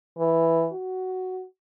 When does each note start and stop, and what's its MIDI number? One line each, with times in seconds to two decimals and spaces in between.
0.18 0.67 52
0.72 1.43 66